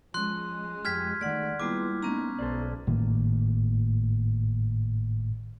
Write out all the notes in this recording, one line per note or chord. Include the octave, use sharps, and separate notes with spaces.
F3 G#3 C#4 C6 F#6
F2 G4 F6 G#6 B6
D#3 A3 D5 F#5
G3 G#3 A#3 B3 E4 F4 D6
G#3 A#3 B3 C#4 D#4 A#5
B1 A4 C5 D5
G#1 A2 D#3 A#3